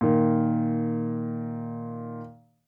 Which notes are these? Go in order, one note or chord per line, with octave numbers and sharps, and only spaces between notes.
A#2 D#3